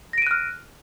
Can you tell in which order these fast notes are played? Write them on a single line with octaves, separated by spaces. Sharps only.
A#6 D7 D#7 F#6 F6